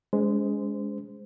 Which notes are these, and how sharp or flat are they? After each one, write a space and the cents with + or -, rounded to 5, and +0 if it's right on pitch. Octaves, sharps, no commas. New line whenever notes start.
G#3 +0 C#4 +45 C5 -20